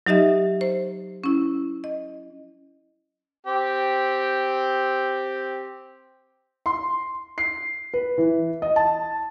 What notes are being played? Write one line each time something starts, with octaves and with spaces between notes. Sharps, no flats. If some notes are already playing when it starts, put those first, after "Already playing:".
F#3 D#4 G4 D#5 E5
C5
C#4 E4
D#5
C4 G4
C6
C7
B4
E3
D#5
A5